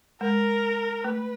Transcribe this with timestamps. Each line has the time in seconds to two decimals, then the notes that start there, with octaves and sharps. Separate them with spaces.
0.21 G#3 A#4
1.04 A3 B4